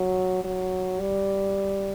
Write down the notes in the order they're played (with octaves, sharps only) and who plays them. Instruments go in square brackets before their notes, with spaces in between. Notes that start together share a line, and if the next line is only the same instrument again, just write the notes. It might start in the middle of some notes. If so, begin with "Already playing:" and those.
Already playing: [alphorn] F#3
F#3
G3